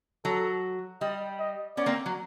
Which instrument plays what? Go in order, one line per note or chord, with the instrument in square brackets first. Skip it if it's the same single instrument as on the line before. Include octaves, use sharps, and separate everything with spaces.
[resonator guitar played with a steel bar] F#3 [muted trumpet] A4
[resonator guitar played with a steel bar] G3 [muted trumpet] D#5
[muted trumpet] D#5
[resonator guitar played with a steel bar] B3 C#4 [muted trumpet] D5
[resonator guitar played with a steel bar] A#3 C4
F#3